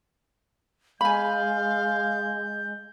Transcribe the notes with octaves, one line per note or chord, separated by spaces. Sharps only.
G#3 F5 G#5 B5 G6